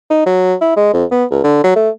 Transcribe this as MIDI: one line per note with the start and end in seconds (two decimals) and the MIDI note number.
0.10 0.26 63
0.26 0.55 54
0.61 0.74 64
0.77 0.90 56
0.93 1.05 41
1.11 1.24 59
1.31 1.40 37
1.44 1.62 50
1.64 1.76 54
1.76 1.89 57